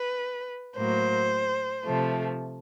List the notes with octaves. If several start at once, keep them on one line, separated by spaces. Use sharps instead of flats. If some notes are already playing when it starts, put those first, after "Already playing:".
Already playing: B4
A2 F#3 A#3 C5
C3 F3 A3